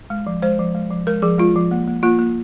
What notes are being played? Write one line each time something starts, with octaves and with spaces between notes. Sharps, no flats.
G#3
F3
G#3 C5
F3
G#3
F3
G#3 A#4
F3 G#4
G#3 F4
F3
A#3
A#3
A#3 F4
A#3